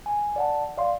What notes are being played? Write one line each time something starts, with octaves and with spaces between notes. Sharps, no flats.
G#5
D5 F#5 A5
D5 F5 C6